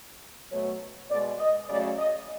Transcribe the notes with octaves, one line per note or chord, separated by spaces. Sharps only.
B2 F#3 A3 C#5
B2 G#3 D5
D#5
C#3 F#3 A3 D5
D#5